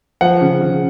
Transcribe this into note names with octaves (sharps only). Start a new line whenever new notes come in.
F3 F#5
C#3
C#3